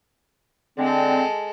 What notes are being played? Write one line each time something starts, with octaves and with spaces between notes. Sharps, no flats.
D3 G#3 C4 A4